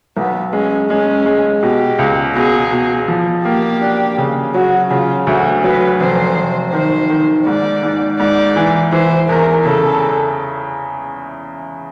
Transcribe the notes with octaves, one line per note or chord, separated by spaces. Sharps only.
B1 B3
G#3 C#4
G#3 C#4
G#3
B2 G4
C#2
B2 G#4
B2
F3
A#3 G4
D4
C#3
F#3 F#4
C#3 F4
D2 F#4
F#3 B4
F1 C5
F1
D#3 C5
D#3
G#2 D5
G#2
G#2 D5
E3
E3 C5
E2 A#4
C#3 A4